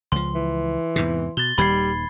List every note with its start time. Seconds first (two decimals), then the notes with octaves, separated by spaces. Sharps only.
0.12 C#2 F3 C6
0.35 E3
0.96 E2 G#2 C3
1.37 B2 A6 G7
1.58 D#1 D#2 D#3 G3 B5 G#6 C7